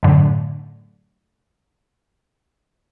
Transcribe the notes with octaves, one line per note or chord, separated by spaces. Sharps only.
F#2 A2 D3